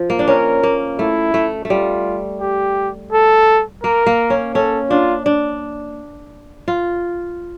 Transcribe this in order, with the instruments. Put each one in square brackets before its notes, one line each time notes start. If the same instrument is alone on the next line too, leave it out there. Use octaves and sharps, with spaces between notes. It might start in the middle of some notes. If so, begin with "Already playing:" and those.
Already playing: [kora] F3
A#3
D4
[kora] C#4 [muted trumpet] A#4
[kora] A#3
[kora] A3 [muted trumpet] E4
[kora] A3
A3
[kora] G3 [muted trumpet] F4
[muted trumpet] G4
A4
[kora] A#3 [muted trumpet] A#4
[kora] A#3
C#4
[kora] C#4 [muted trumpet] A4
[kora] D4 [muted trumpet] F4
[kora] D4
F4